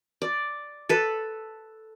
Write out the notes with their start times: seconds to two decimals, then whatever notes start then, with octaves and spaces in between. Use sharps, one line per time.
0.22 D5
0.89 A4 B4